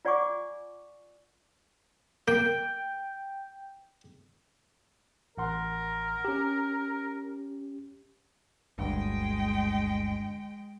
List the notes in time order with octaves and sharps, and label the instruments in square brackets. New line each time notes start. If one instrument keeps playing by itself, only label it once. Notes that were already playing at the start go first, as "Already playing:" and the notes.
[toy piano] F4 D5 F#5 G#5 C#6 D6
[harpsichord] A#3 [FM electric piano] G5
[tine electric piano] A1 F#5 C6 [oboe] A#4
[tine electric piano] C#4 G4
[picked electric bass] G1 D2 G2 [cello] G#3 G5